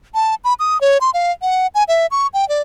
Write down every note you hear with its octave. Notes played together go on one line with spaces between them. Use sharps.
A5
B5
D#6
C#5
C6
F5
F#5
G#5
E5
C#6
G5
D5